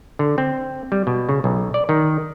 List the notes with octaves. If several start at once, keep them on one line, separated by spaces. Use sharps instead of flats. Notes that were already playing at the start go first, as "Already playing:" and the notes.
D3
C4
G3
B2
C#3
B1
D5
D#3